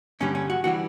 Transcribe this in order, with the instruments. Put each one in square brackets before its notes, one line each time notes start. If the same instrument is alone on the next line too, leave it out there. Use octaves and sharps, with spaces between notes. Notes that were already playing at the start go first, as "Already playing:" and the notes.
[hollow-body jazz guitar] G2 D3 G3 C#4
C#4
F#4
E3 G3 F#4